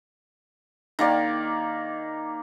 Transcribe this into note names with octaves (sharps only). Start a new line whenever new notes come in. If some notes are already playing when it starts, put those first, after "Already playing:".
D#3 A#3 D5